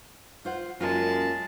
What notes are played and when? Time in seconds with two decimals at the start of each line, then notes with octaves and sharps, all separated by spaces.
0.45 F4 C5 F#5
0.80 F#2 G#3 A#3 F4 A5